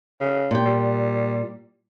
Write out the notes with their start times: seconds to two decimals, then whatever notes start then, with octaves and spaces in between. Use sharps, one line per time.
0.21 C#3
0.51 A#2 G4
0.66 G3